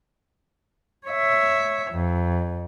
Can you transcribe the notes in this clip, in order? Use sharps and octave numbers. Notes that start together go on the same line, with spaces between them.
C#5 E5
F2